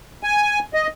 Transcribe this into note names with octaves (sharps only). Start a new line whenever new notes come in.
G#5
D#5